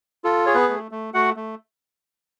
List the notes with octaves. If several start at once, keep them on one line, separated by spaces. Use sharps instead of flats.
F4 A4
G#4 C#5
B3 B4
A3
A3
A3 F#4 F#5
A3